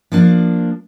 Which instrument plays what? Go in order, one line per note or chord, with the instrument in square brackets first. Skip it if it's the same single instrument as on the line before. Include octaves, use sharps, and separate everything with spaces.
[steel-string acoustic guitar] F3 A#3 D4